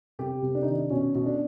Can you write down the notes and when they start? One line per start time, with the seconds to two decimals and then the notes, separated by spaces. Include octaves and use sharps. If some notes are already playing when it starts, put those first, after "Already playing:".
0.19 C3 G4
0.42 C3
0.55 D4
0.63 D#4
0.66 D#3 D4
0.90 B2 C#4
1.15 B2
1.26 D4